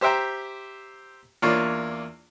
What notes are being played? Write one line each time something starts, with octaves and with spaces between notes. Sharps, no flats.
G4 C5 E5 G5 A#5
E2 A#3 D4 F4 C#5 D5